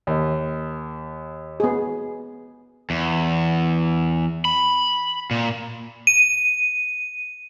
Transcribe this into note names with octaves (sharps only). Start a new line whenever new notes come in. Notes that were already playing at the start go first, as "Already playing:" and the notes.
D#2
B3 G#4
E2
B5
A#2
D#7